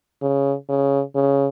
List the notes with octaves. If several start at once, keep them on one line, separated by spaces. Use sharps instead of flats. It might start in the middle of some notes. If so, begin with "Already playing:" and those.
C#3
C#3
C#3